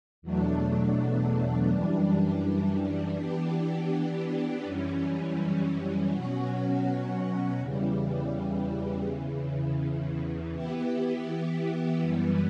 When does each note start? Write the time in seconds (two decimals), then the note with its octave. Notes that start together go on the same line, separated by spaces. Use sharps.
0.22 E2 B2 F#3 A3 D4
1.69 F#2 E3 G3 D4
3.17 E3 B3 D4 G4
4.65 F#2 E3 G3 C#4
6.12 B2 F#3 C#4 F#4
7.59 E2 C#3 E3 G3
9.06 E2 C#3 E3
10.54 E3 B3 E4 G4
12.01 F#2 E3 G3 B3